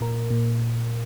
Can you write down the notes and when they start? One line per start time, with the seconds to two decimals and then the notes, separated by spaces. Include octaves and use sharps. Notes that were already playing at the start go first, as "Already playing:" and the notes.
0.01 A#2 A#4
0.30 A#2